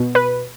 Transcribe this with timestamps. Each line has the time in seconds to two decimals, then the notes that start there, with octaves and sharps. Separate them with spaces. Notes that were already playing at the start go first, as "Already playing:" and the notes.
Already playing: B2
0.15 B4